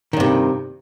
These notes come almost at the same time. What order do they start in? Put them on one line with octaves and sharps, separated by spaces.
D#3 G2 C3